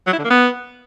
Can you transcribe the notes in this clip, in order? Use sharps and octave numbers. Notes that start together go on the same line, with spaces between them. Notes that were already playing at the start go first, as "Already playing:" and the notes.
F#3
E4
D3
A#3
B3